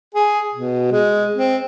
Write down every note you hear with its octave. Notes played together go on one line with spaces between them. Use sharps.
G#4
B2
G#3
C4